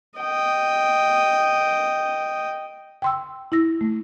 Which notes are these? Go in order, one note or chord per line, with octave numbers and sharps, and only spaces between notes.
D#5 G5
G5 C6 E6
E4 E6 A#6
A3